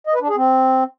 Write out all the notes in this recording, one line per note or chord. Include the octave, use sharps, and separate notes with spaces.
D#5
B4
D4
G#4
C4